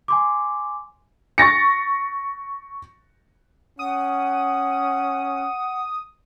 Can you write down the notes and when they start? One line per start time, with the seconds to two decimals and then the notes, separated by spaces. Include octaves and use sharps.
0.08 G#5 C6 D6
1.38 C#6 A6 A#6 C#7
3.79 C#4 F#5 D#6